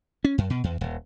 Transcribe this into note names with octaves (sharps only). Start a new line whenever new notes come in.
C#4
F#2
B2
E2
D#1